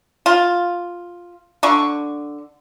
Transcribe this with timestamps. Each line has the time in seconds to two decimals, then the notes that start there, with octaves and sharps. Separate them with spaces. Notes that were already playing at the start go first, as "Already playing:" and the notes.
0.26 F4
1.63 D3 D4 C#6